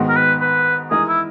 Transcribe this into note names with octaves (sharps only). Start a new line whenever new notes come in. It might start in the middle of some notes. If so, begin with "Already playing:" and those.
Already playing: G#2 D#3 G#3 B3 F#4
A#4
B4
B4
E3 G#3 D#4 G#4 A#4 D#5
E4